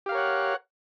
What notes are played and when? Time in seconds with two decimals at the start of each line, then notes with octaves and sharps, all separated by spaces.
0.06 G4
0.09 F5
0.12 A#4
0.15 C#5
0.17 F#5